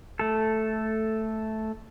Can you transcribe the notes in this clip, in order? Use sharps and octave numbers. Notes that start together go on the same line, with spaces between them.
A3 A4